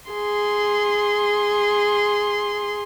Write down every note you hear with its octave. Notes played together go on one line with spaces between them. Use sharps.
G#4 C6